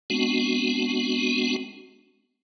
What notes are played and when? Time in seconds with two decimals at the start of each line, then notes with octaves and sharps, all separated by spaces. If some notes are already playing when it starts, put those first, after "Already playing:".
0.10 G#3 B3 C4 D4 F#4